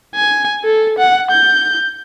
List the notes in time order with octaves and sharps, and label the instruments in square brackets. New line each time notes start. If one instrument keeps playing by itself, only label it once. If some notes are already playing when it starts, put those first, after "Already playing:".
[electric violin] G#5
A4
F#5
G6